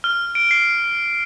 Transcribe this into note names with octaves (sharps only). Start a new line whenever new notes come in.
F6
D7
C7